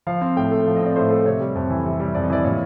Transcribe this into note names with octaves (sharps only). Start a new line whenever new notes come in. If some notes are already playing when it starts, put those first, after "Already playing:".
F3 F5
C4
A2 G5
A3
F3
D#5
C4 D5
A2 C5
A3
C3 C#5
G3
F2
E3
C3
G3
F2 D5
D#5
E3 D5
A#2 C#5